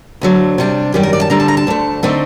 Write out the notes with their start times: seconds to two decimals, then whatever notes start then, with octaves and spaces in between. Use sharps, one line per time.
0.21 D2 D3 F#3 A3
0.58 C3 G3 D4
0.94 F#2 D#3 G3 G4
1.03 A#4
1.13 D5
1.21 A5
1.30 D2 D3 G3 D4 A#5
1.40 A5
1.48 A#5
1.57 A5
1.67 D2 D3 A3
2.03 D3 A3 C4 D#4